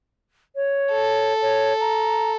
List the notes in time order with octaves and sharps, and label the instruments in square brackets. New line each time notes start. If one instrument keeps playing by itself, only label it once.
[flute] C#5
[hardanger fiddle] A4
[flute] C#5
A#5